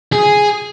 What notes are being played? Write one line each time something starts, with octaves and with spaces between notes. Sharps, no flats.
G#4